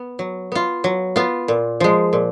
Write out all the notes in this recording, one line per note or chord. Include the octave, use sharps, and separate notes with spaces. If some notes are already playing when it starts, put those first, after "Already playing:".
Already playing: B3
F#3
B3 F4
F#3
B3 F4
A#2
F3 G#3
A#2